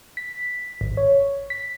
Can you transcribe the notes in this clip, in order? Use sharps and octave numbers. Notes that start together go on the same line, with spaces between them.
B6
G#1
C#5
B6